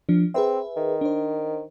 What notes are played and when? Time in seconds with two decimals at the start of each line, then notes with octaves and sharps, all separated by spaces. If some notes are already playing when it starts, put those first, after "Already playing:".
0.09 F3 D4
0.34 C4 G#4 B4 E5
0.76 D#3
1.01 D4 C5